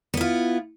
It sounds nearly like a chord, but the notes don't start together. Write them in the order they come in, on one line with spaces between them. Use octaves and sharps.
B3 E4 F4